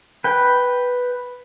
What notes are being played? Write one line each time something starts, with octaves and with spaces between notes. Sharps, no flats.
B4 G5